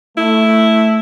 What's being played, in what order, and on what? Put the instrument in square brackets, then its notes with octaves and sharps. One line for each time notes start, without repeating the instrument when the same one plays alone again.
[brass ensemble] A3 [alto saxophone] E4